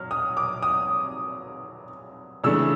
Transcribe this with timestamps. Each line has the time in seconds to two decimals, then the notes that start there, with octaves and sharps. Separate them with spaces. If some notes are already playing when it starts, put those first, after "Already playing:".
Already playing: F#3 F6
0.11 D#6
0.37 D6
0.63 D#6
2.44 C#3 E3 A3 D4 E6